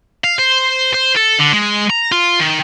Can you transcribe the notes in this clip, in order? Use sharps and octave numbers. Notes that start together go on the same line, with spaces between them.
F5
C5
C5
A4
D3
G#3
A#5
F4
D#3